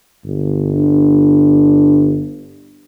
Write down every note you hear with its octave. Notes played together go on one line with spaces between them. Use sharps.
G1
D4